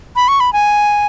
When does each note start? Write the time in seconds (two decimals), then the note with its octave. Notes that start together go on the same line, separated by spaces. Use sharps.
0.16 B5
0.28 C#6
0.40 B5
0.53 G#5